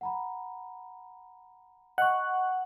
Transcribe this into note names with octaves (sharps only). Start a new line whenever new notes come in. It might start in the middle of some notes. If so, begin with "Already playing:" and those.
F#5 A#5 B5
D#5 F#5 C#6